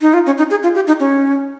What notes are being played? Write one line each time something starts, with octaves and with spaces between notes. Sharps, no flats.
D#4
F4
C#4
D#4
G#4
F4
G4
D#4
C#4